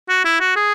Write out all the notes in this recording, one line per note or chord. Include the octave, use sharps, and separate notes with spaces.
F#4
E4
F#4
G#4